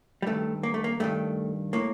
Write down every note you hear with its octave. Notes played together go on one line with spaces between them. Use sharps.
G3
G2 D#3 A3
A#3
A3
A#3
G2 D#3 A3
A2 A#3